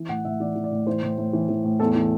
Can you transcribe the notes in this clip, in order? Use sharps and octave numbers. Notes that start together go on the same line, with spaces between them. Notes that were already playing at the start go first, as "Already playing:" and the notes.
Already playing: E3
A2 F#5
A2 E5
E3 D5
E3
D5
A2
E3 C5
A2
A2
E3
E3
A2
E2 A4
E3